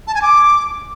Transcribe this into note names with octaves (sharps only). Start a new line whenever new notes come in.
A5
G#5
D6